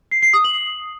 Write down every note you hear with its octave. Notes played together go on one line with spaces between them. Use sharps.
C7
C7
D#6
F#7